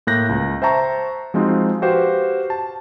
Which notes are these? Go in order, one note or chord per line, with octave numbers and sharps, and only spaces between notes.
A2 A#3 F#6 G6 A#6
C#2
C5 E5 G5 A5 A#5 C#6
F3 G#3 C4 D#4 F4 F#4
F#4 G4 B4 C5 F5 G5
A5